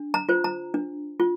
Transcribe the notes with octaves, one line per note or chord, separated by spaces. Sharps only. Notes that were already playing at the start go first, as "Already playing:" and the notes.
Already playing: D4
A#5
F4 C5
A#5
D4
F4